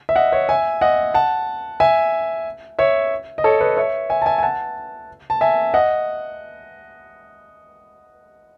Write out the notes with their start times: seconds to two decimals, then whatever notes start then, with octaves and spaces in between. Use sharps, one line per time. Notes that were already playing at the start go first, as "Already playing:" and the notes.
0.09 E5
0.16 D#5 F#5
0.32 C#5 E5
0.49 E5 G#5
0.81 D#5 F#5
1.14 F#5 A5
1.80 E5 G#5
2.79 C#5 E5
3.38 D#5
3.44 A4 C#5
3.60 B4 D#5
3.77 C#5 E5
4.10 E5 G#5
4.22 A5
4.26 E5 G#5
4.39 G#5
4.43 F#5 A5
5.30 A5
5.41 E5 G#5
5.74 D#5 F#5